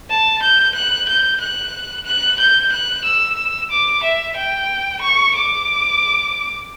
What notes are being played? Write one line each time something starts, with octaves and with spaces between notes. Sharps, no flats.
A5
G6
F#6
G6
F#6
F#6
G6
F#6
E6
D6
E5
G5
C#6
D6